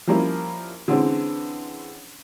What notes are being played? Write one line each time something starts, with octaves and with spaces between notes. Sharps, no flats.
F3 G3 A#3 C#4 E4
D3 E3 G#3 C4 C#4